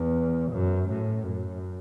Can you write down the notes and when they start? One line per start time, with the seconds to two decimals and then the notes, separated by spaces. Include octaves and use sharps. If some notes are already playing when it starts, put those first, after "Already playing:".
Already playing: E2
0.52 F#2
0.89 A2
1.27 F#2